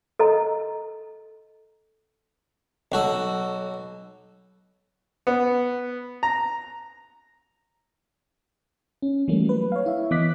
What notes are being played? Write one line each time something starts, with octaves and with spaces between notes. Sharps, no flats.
A4 D#5 A#5
B1 F#4 A4
B3
A#5
C#4
E3 F#3 G3 A3 A#3 C#4
B4
C#5 F5
E4 E5
E3 B3 D#5 D6 F#6 B6